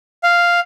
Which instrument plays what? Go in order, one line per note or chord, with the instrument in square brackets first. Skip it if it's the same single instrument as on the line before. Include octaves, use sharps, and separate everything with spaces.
[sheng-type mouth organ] F5